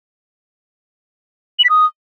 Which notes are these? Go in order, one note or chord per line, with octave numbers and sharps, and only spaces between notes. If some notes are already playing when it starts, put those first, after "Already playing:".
F#7
B6
D#6